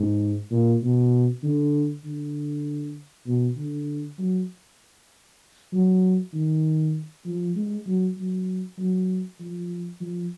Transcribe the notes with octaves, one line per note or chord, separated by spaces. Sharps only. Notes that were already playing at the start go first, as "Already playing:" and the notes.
Already playing: G#2
A#2
B2
D3
D3
B2
D3
F#3
F#3
D#3
F3
G#3
F#3
F#3
F#3
F3
F3